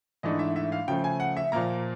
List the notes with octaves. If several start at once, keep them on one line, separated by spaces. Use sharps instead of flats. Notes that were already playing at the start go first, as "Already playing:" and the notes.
G#2 E3 A3 D4 D#5
E5
E5
F5
C#3 F3 A3 G5
G#5
F#5
E5
A#2 F3 A#3 A#5